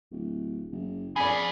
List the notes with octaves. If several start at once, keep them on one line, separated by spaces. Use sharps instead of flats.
D1
F#1
F2 C4 G#4 D5 G#5 B5